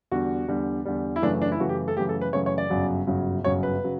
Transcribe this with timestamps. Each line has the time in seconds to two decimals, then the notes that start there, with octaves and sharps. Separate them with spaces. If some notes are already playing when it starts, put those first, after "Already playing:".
0.11 E2 D3 G3 F#4
0.48 E2 D3 G3
0.85 E2 D3 G3
1.16 E4
1.22 F#2 C#3 E3 A3 D4
1.42 D4
1.52 E4
1.59 F#2 C#3 E3 A3 F#4
1.69 G4
1.88 A4
1.96 F#2 C#3 E3 A3 G4
2.09 A4
2.21 B4
2.33 F#2 C#3 E3 A3 C#5
2.46 C#5
2.58 D5
2.70 G1 F#2 C#3 F#3
3.07 G1 F#2 C#3 F#3
3.44 G1 F#2 C#3 F#3 C#5
3.63 B4
3.84 C#3 F#3